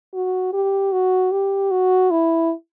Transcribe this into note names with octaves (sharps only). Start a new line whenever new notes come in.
F#4
G4
F#4
G4
F#4
E4